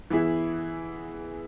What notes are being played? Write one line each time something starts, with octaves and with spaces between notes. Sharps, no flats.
E3 B3 E4 G#4